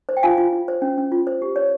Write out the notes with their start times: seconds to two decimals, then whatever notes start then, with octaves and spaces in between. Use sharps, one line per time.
0.09 C5
0.17 G5
0.23 F4 F5 G#5
0.38 F4
0.53 F4
0.68 C5
0.82 C#4
0.98 C#4
1.12 F4
1.27 C5
1.42 G4
1.56 C#5